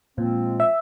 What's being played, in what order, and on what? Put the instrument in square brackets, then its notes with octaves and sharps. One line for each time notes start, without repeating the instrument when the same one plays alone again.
[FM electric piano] A#2 [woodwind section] F3 G#3 C4
[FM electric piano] E5